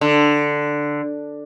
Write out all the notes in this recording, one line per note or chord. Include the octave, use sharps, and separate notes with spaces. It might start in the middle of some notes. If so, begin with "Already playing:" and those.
D3